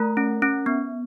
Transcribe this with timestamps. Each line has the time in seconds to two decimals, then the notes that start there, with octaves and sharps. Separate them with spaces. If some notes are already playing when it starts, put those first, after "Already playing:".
Already playing: A3 A#4 A#5
0.17 C#4
0.42 C#4
0.66 B3